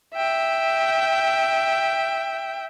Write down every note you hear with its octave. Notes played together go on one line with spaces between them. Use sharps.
E5 G5